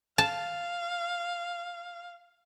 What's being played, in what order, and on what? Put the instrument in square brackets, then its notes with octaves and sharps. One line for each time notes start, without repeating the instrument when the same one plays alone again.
[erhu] F5 [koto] A5